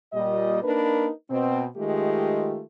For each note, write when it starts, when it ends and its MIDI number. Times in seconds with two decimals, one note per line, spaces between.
0.13 0.62 46
0.13 0.62 55
0.13 0.62 75
0.63 1.09 58
0.63 1.09 62
0.63 1.09 63
0.63 1.09 70
0.63 1.09 71
1.30 1.65 47
1.30 1.65 60
1.77 2.63 51
1.77 2.63 56
1.77 2.63 57
1.77 2.63 65
1.77 2.63 67